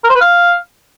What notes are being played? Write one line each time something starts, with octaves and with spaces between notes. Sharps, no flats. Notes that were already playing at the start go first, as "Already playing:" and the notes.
A#4
C5
B4
F5